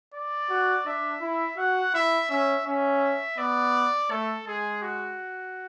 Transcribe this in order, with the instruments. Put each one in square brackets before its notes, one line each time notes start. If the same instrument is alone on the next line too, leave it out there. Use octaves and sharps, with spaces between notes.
[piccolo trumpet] D5
[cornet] F#4
[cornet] D4 [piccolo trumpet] E5
[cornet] E4
[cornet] F#4 [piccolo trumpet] F#5
[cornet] E4 [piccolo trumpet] E5
[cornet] C#4 [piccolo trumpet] E5
[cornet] C#4 [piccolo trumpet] E5
[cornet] B3 [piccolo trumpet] D5
[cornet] A3 [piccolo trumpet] A4
[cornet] G#3 [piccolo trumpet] G#4
[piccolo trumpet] F#4